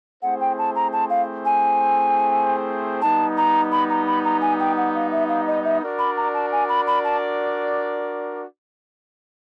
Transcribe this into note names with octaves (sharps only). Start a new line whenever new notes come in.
A3 C4 E4 G#4 C5 F#5
G5
A5
A#5
A5
F5
G#5
G3 B3 D#4 A5
A#5
B5
A#5
B5
A#5
G#5
G5
F#5
F5
E5
F5
D#5
E5
D4 F#4 A#4 D5
B5
A#5
A5
G#5
B5
B5
A5